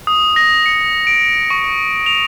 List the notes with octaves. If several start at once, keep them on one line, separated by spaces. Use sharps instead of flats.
D#6
A#6
C#7
D7
C#6
F7